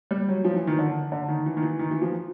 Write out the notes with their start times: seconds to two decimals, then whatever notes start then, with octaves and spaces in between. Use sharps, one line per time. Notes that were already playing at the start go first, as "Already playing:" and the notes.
0.11 G3
0.28 F#3
0.44 F3
0.56 E3
0.67 D#3
0.79 D3
1.12 D3
1.28 D#3
1.46 E3
1.57 D#3
1.63 E3
1.79 D#3
1.91 E3
2.02 F3